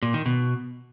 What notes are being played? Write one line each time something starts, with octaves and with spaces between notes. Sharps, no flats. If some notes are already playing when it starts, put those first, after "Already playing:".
A#2
D#3
B2